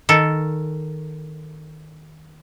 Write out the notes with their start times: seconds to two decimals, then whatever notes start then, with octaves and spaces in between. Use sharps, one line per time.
0.09 D#3 A4